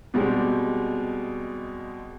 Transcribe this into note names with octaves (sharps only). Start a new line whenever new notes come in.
B2 G3 G#3 C4 G4